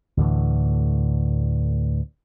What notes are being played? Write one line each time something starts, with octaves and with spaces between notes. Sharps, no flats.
D2 A2 E3